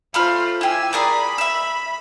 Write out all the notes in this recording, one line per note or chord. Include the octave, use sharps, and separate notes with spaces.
A3 F4 C5 B5 F6
E4 G4 G#5 E6
G#4 A#4 D5 B5
E5 E6